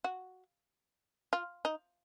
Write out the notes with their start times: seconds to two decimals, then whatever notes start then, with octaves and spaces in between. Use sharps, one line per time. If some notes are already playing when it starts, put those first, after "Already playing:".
0.04 F#4
1.33 F4
1.65 D#4